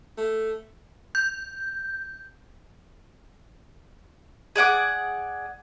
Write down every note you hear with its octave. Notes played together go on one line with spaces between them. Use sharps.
A3
G6
G#4 D5 F#5 D6